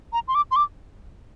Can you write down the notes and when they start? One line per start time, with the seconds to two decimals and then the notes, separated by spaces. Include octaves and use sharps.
0.13 A#5
0.28 C6
0.35 D6
0.51 C6
0.56 D6